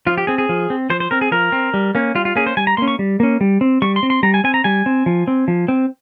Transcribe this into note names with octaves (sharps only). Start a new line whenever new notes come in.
F3 F4
G4
C4 G#4
G#4
F3
C4
F3 C5
C5
C4 A#4
G#4
F3 A#4
C4
G3
A#3 C#4
G3 F4
F4
A#3 C#4 G#4
C5
G3 G#5
A#5
A#3 C#4 C6
C#6
G3
A#3 C#4
G3
C4
G3 C#6
C6
C4
C6
G3 A#5
G#5
C4 G#5
A#5
G3 G#5
C4
F3
C4
F3
C4